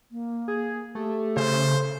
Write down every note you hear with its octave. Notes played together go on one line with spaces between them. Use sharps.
A#3
G#4
A3 G4
C#3 C5